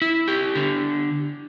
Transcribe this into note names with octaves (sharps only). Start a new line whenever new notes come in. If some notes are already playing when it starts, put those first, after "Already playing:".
E4
G4
D3